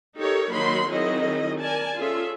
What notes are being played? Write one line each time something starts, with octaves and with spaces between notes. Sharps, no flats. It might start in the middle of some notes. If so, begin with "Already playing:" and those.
D#4 G4 A4 A#4 C#5
D#3 F#3 A#3 D#4 B5 C6
D#3 F#3 C4 E4 G#4 D#5
A#4 D5 G#5 A5
C#4 F4 G#4 A4 E5